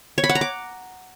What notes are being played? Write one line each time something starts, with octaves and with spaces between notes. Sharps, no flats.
C#5
B5
F#5
A#5
D6